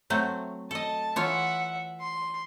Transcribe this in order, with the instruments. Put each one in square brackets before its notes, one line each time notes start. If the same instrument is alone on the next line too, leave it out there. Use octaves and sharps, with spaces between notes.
[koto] F#3 A3 C4
[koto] A4 D#5 [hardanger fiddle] A5
[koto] E3 F4 C#5 [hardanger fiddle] E5 F#5
[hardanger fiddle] C6